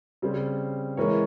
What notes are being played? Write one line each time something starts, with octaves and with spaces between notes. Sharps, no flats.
C#3 G3 C4
E3 G#3 E4 A#4 C#5